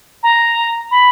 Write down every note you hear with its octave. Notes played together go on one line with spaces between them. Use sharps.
A#5
B5